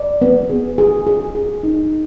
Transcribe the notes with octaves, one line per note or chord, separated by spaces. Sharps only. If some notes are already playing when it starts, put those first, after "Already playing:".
Already playing: D5
B3
G#4
G#4
G#4
G#4
D#4